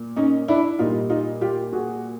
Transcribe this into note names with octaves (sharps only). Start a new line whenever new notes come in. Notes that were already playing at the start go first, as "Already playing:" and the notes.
Already playing: A#2
C#4 D#4
D4 E4
A#2 G3 D#4 F4
D#4 F4
F4 G4
F#4 G#4